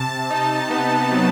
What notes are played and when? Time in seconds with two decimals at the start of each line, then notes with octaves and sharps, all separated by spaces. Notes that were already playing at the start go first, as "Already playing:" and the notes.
Already playing: C3 A5
0.30 D#4
0.70 B3
1.11 F#3